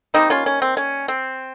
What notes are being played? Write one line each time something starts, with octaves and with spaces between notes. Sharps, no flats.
D#3 G3 A#3 C4 D#4
C#4 F4
C#4
C4
C#4
C4